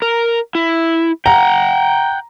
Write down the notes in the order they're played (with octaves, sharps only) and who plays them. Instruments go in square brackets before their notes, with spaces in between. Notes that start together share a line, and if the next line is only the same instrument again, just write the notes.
[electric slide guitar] A#4
E4
[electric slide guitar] F#5 G5 [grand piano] A#5